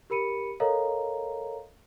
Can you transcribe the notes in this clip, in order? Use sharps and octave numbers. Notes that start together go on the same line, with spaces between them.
G4 A#4 B5 C#7 D#7
A4 A#4 C#5 D#5 F5 A#5